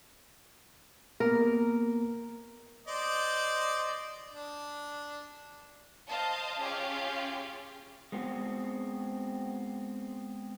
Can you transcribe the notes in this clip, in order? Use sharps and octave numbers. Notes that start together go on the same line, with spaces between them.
A#3 B3 A#4
C5 D5 D#5
D4
C5 D#5 F5 A5
C#4 F4 G4 G#4 F5
G#3 B3 C4 F#4